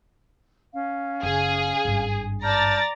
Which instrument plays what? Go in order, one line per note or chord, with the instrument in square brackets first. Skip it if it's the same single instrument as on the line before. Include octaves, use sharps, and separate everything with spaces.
[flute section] C#4 F5
[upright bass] F#1 [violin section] G#4
[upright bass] G#1 G2
[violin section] D5 A#5 A6 [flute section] A5 F6 G6